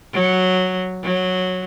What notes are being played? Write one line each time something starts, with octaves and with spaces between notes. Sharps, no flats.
F#3
F#3